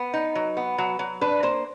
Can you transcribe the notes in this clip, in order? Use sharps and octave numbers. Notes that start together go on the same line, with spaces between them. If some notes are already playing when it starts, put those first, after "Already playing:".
Already playing: B3 B4
D#4
F#3
B3
F#3
F#3
D4 B4
A#3 C5